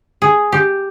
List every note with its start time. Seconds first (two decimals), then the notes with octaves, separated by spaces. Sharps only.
0.22 G#4
0.52 G4